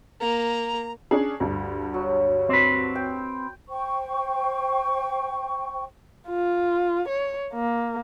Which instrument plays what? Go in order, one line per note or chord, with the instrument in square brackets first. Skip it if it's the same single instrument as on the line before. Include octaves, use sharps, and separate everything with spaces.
[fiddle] A#3 [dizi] A#5
[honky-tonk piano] C#4 D4 G#4
D2 G2
[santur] F#3
[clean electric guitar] C4 B4
[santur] G5
[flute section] C5 G5 C#6
[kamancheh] F4
C#5
A#3